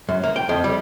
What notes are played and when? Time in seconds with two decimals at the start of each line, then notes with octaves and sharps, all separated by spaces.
0.09 F#2
0.24 A#3
0.36 G5
0.49 F2
0.64 G3